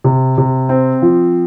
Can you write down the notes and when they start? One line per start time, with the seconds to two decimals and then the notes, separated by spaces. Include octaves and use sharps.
0.04 C3
0.38 C3
0.69 C4
1.02 F3